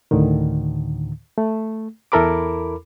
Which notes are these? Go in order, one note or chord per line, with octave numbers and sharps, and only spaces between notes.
D2 A2 D3 D#3
A3
E2 E4 A4 A#4 B5 D6